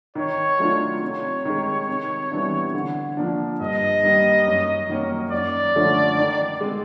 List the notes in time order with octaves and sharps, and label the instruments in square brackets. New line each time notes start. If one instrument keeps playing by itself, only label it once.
[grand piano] D#3 [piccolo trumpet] C#5
[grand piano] F#3 A3 D4 F4
[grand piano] C3 [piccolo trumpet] C#5
[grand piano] D#3 G#3
C3
E3 G3 B3 D4
D3
F3 A#3 D4
[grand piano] G2 [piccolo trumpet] D#5
[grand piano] D#3 G3 A#3
F#2
D#3 F#3 A#3 C#4
[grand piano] F#2 [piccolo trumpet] D5
[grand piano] D3 F3 A3 C#4
D#3
G#3 C4